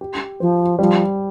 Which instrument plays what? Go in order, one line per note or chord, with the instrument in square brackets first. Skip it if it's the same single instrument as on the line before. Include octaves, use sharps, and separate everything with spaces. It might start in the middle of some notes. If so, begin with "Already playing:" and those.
[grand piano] G4
[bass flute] F3 [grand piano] C5
[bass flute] F3 [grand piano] G3